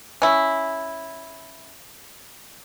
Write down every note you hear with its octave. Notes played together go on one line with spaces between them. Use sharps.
C#4 E4